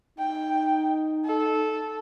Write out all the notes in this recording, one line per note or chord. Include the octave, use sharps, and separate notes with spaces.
D#4 G5
A4